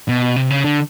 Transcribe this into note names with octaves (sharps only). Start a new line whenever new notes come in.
B2
C3
C#3
D3